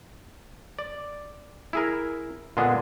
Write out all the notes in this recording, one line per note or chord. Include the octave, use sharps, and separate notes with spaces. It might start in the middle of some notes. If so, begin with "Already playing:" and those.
D5
E4 G#4 A#4
A#2 D3 G#3 B3 D4 G#4